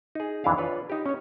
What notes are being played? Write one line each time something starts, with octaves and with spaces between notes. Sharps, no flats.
D#4 G#4
F2 E3 D4 E4 G#4 F5
D4 F4 B4 C#5
D#4 G4
C#4 C#5